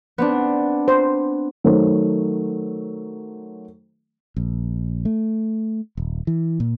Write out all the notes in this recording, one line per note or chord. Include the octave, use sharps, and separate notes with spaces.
B3 C4 D4
C5
D#3 F#3 A3 C5
A#1
A3
D#1
E3
A#2